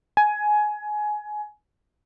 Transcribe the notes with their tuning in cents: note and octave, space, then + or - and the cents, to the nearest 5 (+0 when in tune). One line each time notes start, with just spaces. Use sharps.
G#5 +20